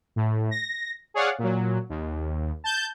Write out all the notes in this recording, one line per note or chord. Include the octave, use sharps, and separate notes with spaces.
A2
A#6
G#4 C#5 D5 F5 F#5
A#2 F#3
D#2
A5 G6